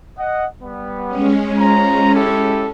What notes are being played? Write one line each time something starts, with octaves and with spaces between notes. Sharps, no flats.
D#5 F#5
G3 B3
G#3 C#4
F4 C5 A#5
E4 G4 A4